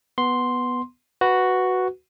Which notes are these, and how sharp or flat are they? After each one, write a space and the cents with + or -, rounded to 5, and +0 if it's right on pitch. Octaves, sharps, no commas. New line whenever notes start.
B3 +0 C6 +0
F#4 +0 B4 +0